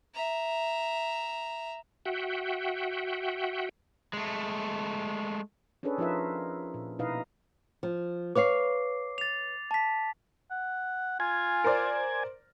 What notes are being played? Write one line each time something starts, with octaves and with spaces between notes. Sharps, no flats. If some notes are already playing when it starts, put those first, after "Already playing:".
E5 A#5
F#4 E5 F#5 G5
G#3 A3
C#4 D4 G#4 A4 B4 C#5
F3 D#4 F4 A#4 B4 E5
A#2
B2 D#4 E4 B4 D#5 F5
F3
B4 C#5 F5 D6 C7
A6 F7
A5 B6
F#5
F4 G#5
A#4 C5 D5